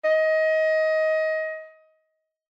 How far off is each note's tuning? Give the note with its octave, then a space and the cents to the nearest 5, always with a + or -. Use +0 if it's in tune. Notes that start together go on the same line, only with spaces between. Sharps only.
D#5 +20